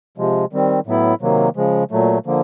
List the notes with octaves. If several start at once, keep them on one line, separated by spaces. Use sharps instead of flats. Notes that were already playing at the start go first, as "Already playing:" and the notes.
C3 F3 G#3
D#3 G3 C4
A2 F#3 B3 E4
C3 D#3 F#3 A#3
C#3 F3 G#3
A#2 F#3 A3
D3 F3 A#3